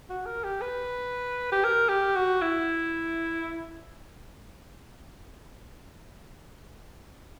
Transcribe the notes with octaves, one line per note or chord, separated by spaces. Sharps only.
F#4
A#4
G4
B4
G4
A#4
G4
F#4
E4